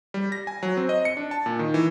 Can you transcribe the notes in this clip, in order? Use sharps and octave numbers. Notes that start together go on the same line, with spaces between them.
G3
A#6
G#5
F#3
C4
D#5
C#7
D4
A5
A#2
D#3
E3